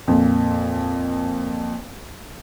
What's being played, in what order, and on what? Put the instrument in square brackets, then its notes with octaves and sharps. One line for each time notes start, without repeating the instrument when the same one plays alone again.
[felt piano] F2 A#2